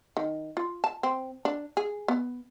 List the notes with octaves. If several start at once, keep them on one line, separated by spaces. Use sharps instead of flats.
D#3
F4
A5
C4
D4
G#4
B3